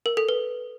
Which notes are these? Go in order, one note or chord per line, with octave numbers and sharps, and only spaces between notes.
A#4
A4
B4